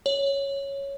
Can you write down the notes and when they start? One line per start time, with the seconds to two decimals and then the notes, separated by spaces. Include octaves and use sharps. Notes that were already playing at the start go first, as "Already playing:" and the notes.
0.06 C#5